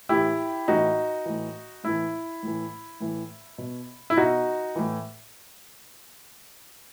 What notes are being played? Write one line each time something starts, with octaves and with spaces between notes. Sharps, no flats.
A2 E3 E4 G4
A2 E3 D#4 F#4
A2 E3
A2 E3 E4
A2 E3
A2 E3
B2
E4
B2 D#4 F#4
A2 E3